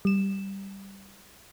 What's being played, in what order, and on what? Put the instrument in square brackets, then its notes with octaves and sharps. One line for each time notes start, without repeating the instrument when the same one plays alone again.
[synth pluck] G3 E7